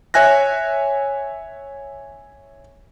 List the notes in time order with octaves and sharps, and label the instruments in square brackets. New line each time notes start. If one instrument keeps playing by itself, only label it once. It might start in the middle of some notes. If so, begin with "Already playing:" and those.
[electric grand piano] C#5 E5 G#5 F#6 A#6